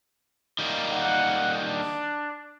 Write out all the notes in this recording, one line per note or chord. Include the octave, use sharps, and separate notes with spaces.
D#3 G3 A#3
F#5
D4